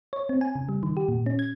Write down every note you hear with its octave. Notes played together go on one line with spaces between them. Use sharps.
C#5
C4
G#5
C#3
G3
D#3
G4
A#2
C#4
G#6